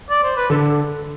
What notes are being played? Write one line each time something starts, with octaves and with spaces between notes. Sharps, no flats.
D5
C5
B4
D3 A4